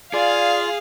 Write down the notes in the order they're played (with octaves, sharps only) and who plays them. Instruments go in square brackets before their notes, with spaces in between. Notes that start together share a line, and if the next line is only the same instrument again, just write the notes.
[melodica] F4 [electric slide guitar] G#4 [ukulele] D5 [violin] F5